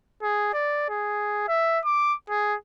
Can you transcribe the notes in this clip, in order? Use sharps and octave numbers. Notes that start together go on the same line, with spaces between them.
G#4
D5
G#4
E5
D6
G#4